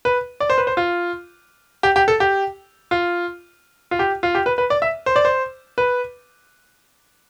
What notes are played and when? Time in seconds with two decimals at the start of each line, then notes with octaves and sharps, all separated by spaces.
0.05 B4
0.40 D5
0.50 C5
0.58 B4
0.67 C5
0.77 F4
1.83 G4
1.96 G4
2.08 A4
2.20 G4
2.91 F4
3.91 F4
3.99 G4
4.23 F4
4.35 G4
4.46 B4
4.58 B4
4.70 D5
4.82 E5
5.06 C5
5.16 D5
5.25 C5
5.78 B4